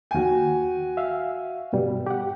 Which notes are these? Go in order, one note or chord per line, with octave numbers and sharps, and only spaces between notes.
D#2 F#4 G5 G#5
E5 F5
G2 B2 G3
G4 F#5